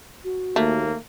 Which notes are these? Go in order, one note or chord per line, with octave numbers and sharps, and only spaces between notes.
F#4
D#2 A3 A#3